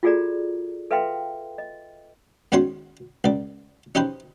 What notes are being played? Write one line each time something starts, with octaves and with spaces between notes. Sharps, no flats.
F4 F#4 G#4 A4 D5 A#5
A4 B4 E5 F5 G5 C6
D#5
G#2 D#3 C#4 F#4 C#5 C6
C#2 D5
C#4 D#4 G4 B4 C5